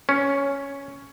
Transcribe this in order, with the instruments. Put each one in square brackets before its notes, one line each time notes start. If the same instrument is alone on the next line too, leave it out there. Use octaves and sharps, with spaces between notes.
[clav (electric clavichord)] C#4